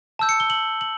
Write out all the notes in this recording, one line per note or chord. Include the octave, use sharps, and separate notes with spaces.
A5 E6 G6
C#7
G7
F#7
F#7